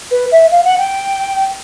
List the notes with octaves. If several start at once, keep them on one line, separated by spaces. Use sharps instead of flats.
B4
E5
F5
F#5
G5